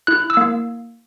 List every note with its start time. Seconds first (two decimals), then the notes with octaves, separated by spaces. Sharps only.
0.07 E4 F#6
0.30 E6
0.37 A#3